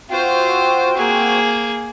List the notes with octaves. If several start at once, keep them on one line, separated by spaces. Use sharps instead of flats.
C4 F4 F#4 C5 G5
A#3 G#4